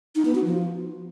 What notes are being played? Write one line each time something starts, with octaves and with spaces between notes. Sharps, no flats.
D#4
B3
F#4
F3